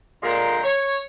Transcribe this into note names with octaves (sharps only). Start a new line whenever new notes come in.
A#2 D3 G#3 A#4 G5 A#5
C#5